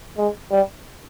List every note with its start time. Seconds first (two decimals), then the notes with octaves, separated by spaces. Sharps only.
0.18 G#3
0.51 G3